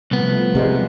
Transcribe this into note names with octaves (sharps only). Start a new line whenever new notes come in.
C2 F3 A3 B3
C3 G3 G#3